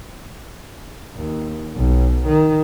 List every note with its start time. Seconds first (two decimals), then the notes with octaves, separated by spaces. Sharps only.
1.15 D#2
1.75 B1
2.27 D#3